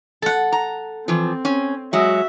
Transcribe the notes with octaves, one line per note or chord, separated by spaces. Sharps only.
A4 F#5
A#5
E3 F3 C4
C#4
F#3 G#3 F#4 E5